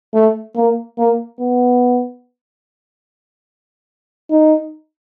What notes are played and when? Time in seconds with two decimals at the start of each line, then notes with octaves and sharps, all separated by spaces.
0.14 A3
0.56 A#3
0.98 A#3
1.39 B3
4.30 D#4